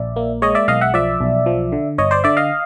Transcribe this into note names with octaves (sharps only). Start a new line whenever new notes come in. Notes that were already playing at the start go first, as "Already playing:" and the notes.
Already playing: A#1 D5 E5
A#3
G#3 C#5 D#5
D5 E5
B1 D#5 F5
E5 F#5
F3 D5 E5
B1
F3
D3
G1 C#5 D#5
C5 D5
D3 D5 E5
D#5 F5